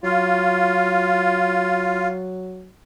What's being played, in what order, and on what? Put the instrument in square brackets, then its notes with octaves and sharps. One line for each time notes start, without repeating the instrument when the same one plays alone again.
[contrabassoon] F#3 [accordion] F4